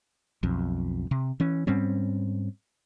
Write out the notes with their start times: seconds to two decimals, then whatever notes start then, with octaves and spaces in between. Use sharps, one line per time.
0.43 B1 F2
1.11 C3
1.40 E3 C#4
1.67 G#2 G3 C4 C#4